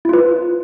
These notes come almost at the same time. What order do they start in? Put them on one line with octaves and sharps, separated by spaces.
E4 F4 B4